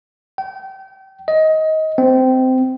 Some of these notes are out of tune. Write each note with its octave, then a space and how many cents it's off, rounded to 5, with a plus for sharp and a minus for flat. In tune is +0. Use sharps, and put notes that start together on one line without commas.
G5 -30
D#5 +20
C4 -20